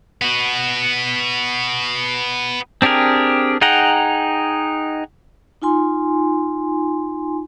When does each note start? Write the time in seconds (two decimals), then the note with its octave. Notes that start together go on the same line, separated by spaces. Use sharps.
0.22 B3 F#4
2.82 C4 D4 G4 G#4 A#4
3.62 D#4 G#4 F#5 G5 A#5
5.62 D#4 F4 G#5 C6